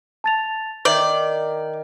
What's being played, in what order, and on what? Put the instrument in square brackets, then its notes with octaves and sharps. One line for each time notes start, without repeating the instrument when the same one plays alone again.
[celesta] A5 A6 F7
[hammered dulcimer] D#3 [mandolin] D5 [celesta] E5 G6